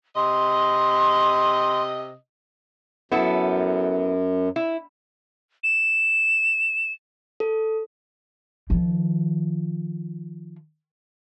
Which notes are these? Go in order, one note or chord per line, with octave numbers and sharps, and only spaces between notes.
C3 D#5 C6
F#2 B3 E4 A4
E4
E7
A4
D#3 F3